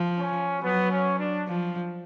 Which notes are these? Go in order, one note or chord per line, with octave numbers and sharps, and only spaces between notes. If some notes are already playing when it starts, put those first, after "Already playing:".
Already playing: F3
C#4
F#3 B3
C#4
D4
F3